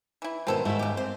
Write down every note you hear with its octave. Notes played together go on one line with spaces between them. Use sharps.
E3 E4
G#2 B2 D#3 C4 A4 C5
G#2 A3 E5
C#3 G4
C4 C5